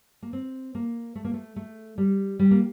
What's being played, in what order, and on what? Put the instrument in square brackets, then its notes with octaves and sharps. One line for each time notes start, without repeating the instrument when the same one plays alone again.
[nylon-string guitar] A#3
C4
A#3
A3
A#3
A3
A3
G3
G3
A#3